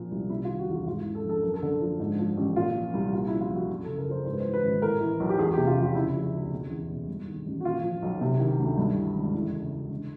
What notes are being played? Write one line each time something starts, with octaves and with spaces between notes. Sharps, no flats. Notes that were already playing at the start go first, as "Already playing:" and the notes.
Already playing: A#2 F3
C2
C3 E4
F4
D#3
F#4
E2 F4
G#2 F4
E4
E3
A4
A#1
A4
F#2 A#4
A4
D3
F3
G#2
F3
A1
A#2 F4
F3
C2
A#2 F4
E4
F3
F4
A#1 F#4
F#2
A4
C#3
A#4
F3 C5
G#2 C5
B4
C5
E3
B4
G#1
A2 A#4
E3
B1
G4
E2 G#4
G4
C3
F4
F1
F4
C#3 E4
F3
D2
B2
E2
B2
G2
D#3
A1
F#4
A#2 F4
F3
B1
C3
D#3
D2
G2
E3
G#1
E2 E4
C#3
E3
D3